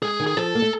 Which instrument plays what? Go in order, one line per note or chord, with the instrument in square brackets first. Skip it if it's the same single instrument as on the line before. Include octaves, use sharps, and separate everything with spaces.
[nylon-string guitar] G#3 [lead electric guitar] G#4
[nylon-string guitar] D#3
[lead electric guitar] G#4
[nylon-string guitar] F3 [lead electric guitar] A4
[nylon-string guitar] A#3
A3